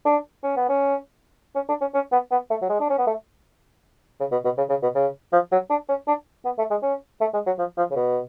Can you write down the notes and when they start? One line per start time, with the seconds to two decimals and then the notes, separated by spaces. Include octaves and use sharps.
0.05 D4
0.43 C#4
0.57 B3
0.69 C#4
1.56 C#4
1.69 D4
1.81 C#4
1.94 C#4
2.12 B3
2.32 B3
2.50 A3
2.62 F#3
2.70 G#3
2.80 D4
2.90 C#4
2.99 B3
3.07 A3
4.20 C#3
4.32 B2
4.44 B2
4.58 C#3
4.69 C#3
4.83 B2
4.95 C#3
5.33 F3
5.52 F#3
5.70 D4
5.89 C#4
6.08 D4
6.45 B3
6.58 A3
6.70 G#3
6.83 C#4
7.21 A3
7.33 G#3
7.47 F#3
7.59 F3
7.77 F3
7.91 C#3
7.96 B2